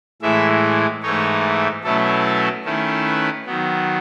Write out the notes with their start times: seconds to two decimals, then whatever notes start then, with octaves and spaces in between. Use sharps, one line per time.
0.22 A2 E3 G#3 E5
1.03 G#2 E3 A3 D#4 C#5
1.84 B2 F#3 A3 C#4 E4 A4
2.24 A4
2.65 D#3 A3 C#4 E4
3.05 B4
3.46 D#3 F#3 B3